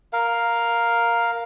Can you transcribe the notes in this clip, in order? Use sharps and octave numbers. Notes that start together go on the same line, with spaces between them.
A#4 F5